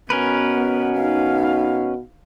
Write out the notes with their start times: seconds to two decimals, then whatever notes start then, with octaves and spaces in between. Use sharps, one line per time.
0.10 B2 B3 C#4 A#4 B4
0.96 D#4 F5